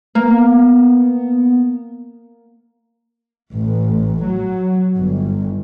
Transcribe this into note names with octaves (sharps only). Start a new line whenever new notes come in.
A#3 B3
A1
F#3
G1